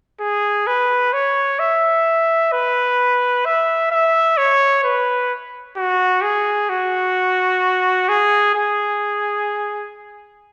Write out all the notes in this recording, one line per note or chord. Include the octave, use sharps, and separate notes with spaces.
G#4
B4
C#5
E5
B4
E5
E5
C#5
B4
F#4
G#4
F#4
G#4
G#4